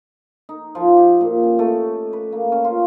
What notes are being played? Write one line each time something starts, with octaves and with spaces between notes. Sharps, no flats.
D#4
F3
G4
A#2
C#4
A3
B4
A#3
C#4
F4